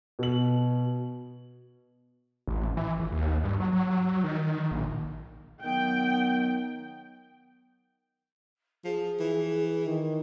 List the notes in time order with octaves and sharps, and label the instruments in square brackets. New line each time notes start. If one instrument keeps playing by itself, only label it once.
[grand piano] B2 F#7
[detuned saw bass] A1
E3
G#1
D#2
G2
F#3
F#3
D#3
A#1
[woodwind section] D#3 F#3 B3 [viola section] G5
[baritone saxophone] F3 [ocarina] G#4
[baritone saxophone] E3
[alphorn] D#3